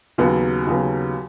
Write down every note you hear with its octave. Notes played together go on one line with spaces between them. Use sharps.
D#2 C#3 F#3 B3
D#2 C#3 F#3 B3